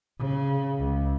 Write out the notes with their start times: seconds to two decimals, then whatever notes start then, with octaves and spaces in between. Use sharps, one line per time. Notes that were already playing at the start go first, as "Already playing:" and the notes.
0.19 C#3
0.78 C#2